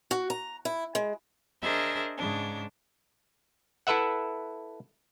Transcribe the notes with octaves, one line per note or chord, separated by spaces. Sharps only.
F#4
A#5
E4
G#3
D4 G#4 A#4 C5 D#5 E5
G#2 C#3 D4
E4 A4 B4 E5 F#5